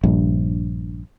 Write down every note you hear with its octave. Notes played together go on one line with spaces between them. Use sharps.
A#1 G2